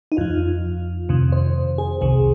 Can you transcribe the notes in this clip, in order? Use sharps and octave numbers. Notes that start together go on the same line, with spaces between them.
D#4
F2 F3 F4
F2 C3 D#3
C5
G#4
C2 C3 D#3 G#4